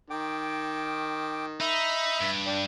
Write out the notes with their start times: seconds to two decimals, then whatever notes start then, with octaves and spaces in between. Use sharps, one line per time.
0.10 D#3 G5 D6
1.60 D#4 E5 B5
2.21 G2
2.47 D4 G5